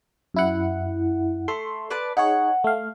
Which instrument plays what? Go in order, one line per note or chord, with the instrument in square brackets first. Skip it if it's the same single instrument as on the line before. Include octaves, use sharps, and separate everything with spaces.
[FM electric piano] F#2 E4 F#5
[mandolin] A3 [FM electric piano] A4 C6
[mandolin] B4 D5 A5
[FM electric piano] D#4 G#4 C#5 [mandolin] F#5
[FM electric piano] A3 F5